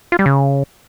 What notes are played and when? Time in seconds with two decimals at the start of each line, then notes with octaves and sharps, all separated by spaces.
0.12 F4
0.19 G3
0.26 C#3